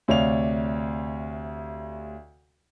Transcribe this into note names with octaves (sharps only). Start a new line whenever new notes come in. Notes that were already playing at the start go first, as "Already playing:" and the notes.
D2 C3 C#5 D5 F5 F7